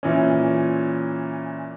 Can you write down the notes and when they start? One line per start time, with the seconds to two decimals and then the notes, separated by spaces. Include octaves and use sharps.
0.03 A#2 E3 C#4